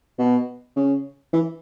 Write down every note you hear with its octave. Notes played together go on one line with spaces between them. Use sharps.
B2
C#3
E3